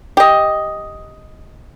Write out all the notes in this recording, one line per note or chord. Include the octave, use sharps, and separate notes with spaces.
G4 D#5